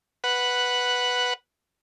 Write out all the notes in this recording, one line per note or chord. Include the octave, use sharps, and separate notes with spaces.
B4 F#5